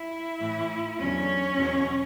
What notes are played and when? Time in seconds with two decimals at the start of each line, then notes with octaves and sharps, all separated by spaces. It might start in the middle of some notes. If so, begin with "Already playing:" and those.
Already playing: E4 E5
0.40 A2 E3
0.99 E2 D3 F#3 C#4 C#5
1.58 E2 B2 F#3